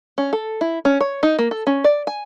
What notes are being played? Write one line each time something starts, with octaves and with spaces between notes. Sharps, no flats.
C#4
A4
E4
C#4
C#5
D#4
A#3
A4
C#4
D5
G#5